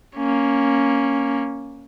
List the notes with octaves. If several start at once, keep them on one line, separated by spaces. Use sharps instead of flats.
A#3 C#4